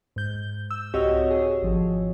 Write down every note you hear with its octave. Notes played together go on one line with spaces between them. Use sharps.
G#2 G6
E6
C2 C4 F#4 G4 C#5 D#5
G#4
G#1 F3